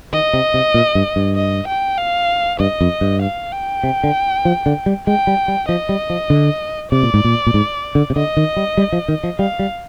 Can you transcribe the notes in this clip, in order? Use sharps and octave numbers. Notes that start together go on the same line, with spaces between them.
D#3 D#5
C3
C3
A#2
G2
G2
D#5
G5
F5
G2 D#5
F2
G2
F5
G5
C3
D3
F3
D3
G3
G#3 G5
G3
G3
F3 D#5
G3
F3
D3
C3 D5
A#2
G#2
A#2
A#2
G#2
D3
C3
D3 D#5
D#3
G3
G3
F3
D#3
F3
G3 F5
G3